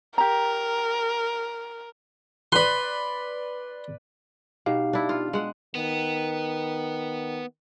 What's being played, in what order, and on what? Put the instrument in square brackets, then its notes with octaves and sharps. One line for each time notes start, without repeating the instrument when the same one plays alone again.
[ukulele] G4 A#5 [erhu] A#4
[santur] B4 D5 [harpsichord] B5 C6
[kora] B2 [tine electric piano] D#4 G4 F5
[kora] D4 E4
F4
G#3 F#5
[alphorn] D#3 [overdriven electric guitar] B3